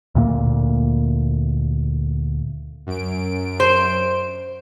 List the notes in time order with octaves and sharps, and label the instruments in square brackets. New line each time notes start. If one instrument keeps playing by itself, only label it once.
[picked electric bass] D2 A#2 A#3
[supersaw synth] F#2 D7
[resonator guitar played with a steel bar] C5